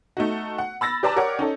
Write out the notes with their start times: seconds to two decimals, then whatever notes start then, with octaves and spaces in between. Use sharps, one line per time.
0.17 A3 D#4 F#4
0.58 F#5
0.81 B5 E6 A6 A#6
1.03 G4 B4 D5 A5 A#5
1.16 G4 A#4 C#5 D5 F#5
1.39 C#4 D#4 A4